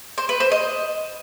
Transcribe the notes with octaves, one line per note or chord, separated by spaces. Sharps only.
C5
B4
C5
D#5